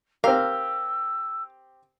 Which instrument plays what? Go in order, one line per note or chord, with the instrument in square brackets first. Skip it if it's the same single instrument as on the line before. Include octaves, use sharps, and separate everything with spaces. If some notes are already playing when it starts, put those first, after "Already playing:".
[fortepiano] C4 G4 [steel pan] A#4 [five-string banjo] F5 [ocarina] E6